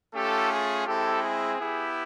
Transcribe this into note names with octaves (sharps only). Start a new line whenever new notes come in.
A3 C#4 F4 G4 A4
G#4
G#3 C4 E4 G4 A4
G#4
B3 E4 G4